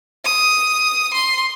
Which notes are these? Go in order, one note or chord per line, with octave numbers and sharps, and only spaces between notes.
D#6
C6